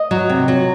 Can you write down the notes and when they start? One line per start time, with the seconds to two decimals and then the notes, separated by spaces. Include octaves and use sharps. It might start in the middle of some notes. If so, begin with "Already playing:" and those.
Already playing: D#5
0.11 F#3
0.30 C3
0.48 F#3